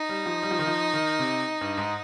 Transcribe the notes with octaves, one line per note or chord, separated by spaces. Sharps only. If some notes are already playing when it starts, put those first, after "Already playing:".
Already playing: D#4
G3
F3
G3
F3
D#3
F3
D#3
C3
G2
G#2